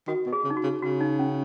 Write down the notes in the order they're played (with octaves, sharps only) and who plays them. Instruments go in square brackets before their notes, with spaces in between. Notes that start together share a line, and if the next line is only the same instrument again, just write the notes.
[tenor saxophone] D#3 [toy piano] F#4
[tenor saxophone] B2
[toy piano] G#4
[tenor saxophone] C#3
[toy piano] D#4
F#4
[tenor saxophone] C#3
[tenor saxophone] C#3 [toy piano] F#4
[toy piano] D#4
C#4